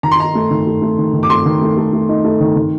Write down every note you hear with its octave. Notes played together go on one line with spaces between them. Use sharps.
D#3 A#5
C6
D#4 A#5
A3
D#3
A3
A3
D#3
D#3
D6
A3 C6
D#3
A3
A3
A3
D#4
A3
D#3
D#3